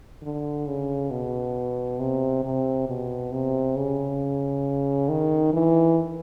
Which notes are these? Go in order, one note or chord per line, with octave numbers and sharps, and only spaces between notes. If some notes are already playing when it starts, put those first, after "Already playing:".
D3
C#3
B2
C3
C3
B2
C3
C#3
D#3
E3